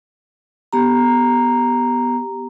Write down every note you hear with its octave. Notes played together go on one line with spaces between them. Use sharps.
B3 G4 A#5